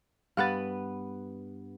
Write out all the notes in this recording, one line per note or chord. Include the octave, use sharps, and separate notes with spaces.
G2 B3 B4 F5 F#5 A6